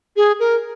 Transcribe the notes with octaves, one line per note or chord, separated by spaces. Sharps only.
G#4
A#4